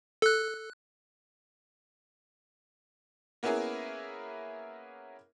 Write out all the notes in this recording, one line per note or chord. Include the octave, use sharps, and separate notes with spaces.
A4 F#6
A#3 B3 C#4 E4 G#4 A#4